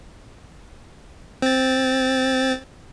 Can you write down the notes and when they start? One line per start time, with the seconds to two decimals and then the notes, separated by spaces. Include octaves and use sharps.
1.42 C4 A6